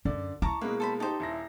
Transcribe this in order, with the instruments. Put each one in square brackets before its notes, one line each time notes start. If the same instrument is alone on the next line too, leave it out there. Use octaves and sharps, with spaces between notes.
[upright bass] F#2 [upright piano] D3 D5
[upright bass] E4 [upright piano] A5 C#6 [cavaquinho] A#5 D6
[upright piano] B2 G#3 A#3 [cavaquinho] B4
[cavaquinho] A4 C5 B5
[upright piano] D#4 G4 [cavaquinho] A4 C5
[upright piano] D#1 E4 A#6